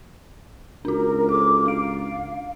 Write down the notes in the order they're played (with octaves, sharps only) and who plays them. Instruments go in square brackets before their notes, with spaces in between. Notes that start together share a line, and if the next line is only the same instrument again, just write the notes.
[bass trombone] C#2 [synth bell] D4 F#4 [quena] A#4
[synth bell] A4 [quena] D6
[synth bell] D4 D7 [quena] F5